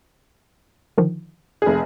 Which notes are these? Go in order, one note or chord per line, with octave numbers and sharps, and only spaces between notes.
D3 D#3 F3
F1 G#4